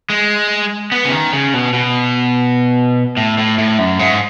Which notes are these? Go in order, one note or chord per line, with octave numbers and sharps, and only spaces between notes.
G#3
B3
C#3
D#3
C#3
B2
B2
A2
A2
A2
F#2
G#2